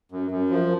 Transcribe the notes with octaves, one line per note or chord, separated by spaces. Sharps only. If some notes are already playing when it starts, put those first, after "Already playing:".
F#2
F#2
F3